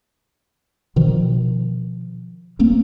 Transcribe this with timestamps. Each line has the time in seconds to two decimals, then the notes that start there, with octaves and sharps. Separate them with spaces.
0.96 B2 D#3 F3
2.59 A3 A#3 C4 C#4